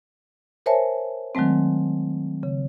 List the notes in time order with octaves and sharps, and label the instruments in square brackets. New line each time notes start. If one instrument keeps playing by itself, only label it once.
[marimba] A#4 C5 C#5 E5 G#5 A5
D#3 F#3 G#3 A3 C4
C#3